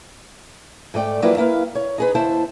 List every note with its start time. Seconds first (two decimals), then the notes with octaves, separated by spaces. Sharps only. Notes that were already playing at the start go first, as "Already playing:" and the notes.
0.94 G#2 A3 D5 G5
1.22 F3 F#3 A#3 E4 B4 D5
1.37 A#3 E4 B4 F5
1.75 C#5
1.98 D#4 G#4 B4
2.15 D#2 E4 C5 A5